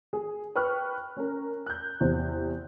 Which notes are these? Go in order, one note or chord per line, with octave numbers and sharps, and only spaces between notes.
G#4
B4 G5 C#6 F6 F#6
C#4 A#4
F#6 G6
E2 C3 C5